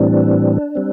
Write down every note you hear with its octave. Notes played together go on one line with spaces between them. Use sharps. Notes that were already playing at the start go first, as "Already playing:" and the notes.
Already playing: A2 E3 G3 C4 D4
G3 C4